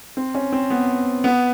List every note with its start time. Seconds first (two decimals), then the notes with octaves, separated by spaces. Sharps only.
0.17 C4
0.35 C#4
0.53 C4
0.70 B3
1.24 B3